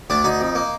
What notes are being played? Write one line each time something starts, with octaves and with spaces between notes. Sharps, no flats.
D2 D4
D2 D#4
F2
A#3